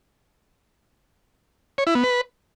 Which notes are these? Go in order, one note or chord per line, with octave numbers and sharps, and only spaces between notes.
C#5
E4
B3
B4